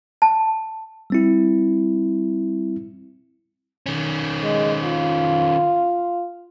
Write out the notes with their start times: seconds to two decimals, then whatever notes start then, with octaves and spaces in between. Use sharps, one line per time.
0.22 A5
1.10 G3 C4 E4
3.86 D#3 C#4
4.43 G#3
4.84 F4